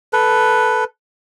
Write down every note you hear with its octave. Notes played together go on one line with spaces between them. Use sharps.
A4 B4